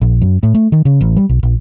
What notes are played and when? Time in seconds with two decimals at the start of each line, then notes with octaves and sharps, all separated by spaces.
0.02 A#1
0.21 F#2
0.43 A2
0.54 A3
0.72 D#3
0.85 C#3
1.01 A1
1.16 G3
1.29 B1
1.43 A#1